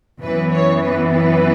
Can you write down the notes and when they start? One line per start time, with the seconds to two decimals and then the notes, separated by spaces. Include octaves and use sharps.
0.23 F#2 E3 B3 B4
0.52 C#5
0.82 B4
1.11 B4